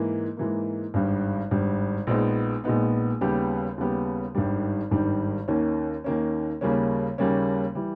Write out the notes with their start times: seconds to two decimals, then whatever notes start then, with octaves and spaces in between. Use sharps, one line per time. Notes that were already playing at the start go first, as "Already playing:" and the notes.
Already playing: G#2 E3 A#3
0.37 G#2 E3 A#3
0.94 G#1 G2 G3
1.51 G#1 G2 G3
2.07 A#1 A#2 G#3 B3 D#4
2.64 A#1 A#2 G#3 B3 D#4
3.21 D#2 C#3 G3 B3 G4
3.78 D#2 C#3 G3 B3 G4
4.35 G#1 G2 D#3 G3
4.91 G#1 G2 D#3 G3
5.48 D#2 D#3 A#3 C#4
6.04 D#2 D#3 A#3 C#4
6.61 D#2 C#3 G3 A#3 C#4
7.18 D#2 C#3 G3 A#3 C#4
7.75 E3 G3